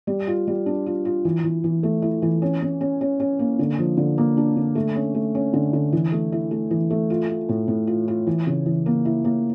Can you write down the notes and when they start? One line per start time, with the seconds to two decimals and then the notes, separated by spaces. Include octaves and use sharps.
0.07 G3
0.27 F4
0.47 G3
0.66 D4
0.86 F4
1.05 F4
1.25 E3
1.44 E3
1.64 E3
1.83 A3
2.02 E4
2.22 E3
2.42 C#4
2.62 C#4
2.81 C#4
3.01 C#4
3.20 C#4
3.39 A#3
3.59 D3
3.79 F3
3.97 D3
4.18 A#3
4.37 D4
4.57 D3
4.75 A3
4.95 C#4
5.14 A3
5.35 C#4
5.53 D3
5.73 D3
5.93 E3
6.12 A3
6.32 E4
6.51 A3
6.71 E3
6.90 A3
7.10 F4
7.29 F4
7.49 A2
7.68 A2
7.87 F4
8.08 F4
8.27 E3
8.47 C#3
8.66 E3
8.86 A#3
9.05 E4
9.24 A#3